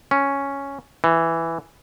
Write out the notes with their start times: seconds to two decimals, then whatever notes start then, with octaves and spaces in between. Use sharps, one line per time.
0.11 C#4
1.04 E3